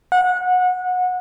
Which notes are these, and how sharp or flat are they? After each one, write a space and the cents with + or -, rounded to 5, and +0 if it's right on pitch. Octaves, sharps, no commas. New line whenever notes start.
F#5 -25